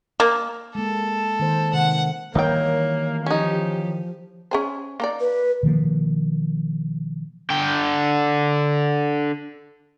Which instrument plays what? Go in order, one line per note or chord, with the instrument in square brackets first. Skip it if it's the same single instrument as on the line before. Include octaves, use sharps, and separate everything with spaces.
[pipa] A#3
[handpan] G#3 A#3 [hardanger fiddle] A4
[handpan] D#3 A#3 C5
[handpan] C3 D#3 [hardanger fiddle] F#5
[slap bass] D#3 E3 G3 [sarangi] A#3 [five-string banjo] D#4 G5 [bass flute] C#5
[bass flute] F3 [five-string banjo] C#4 D#4 [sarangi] G4
[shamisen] C#4 G#4 C5
A#3 D#4 D5
[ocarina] B4
[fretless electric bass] B2 D#3 F3 A#3
[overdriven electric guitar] D3 G5